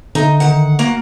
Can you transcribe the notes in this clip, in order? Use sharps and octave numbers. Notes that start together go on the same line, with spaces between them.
D3 D#4
D#3 F#5
A#3 F#4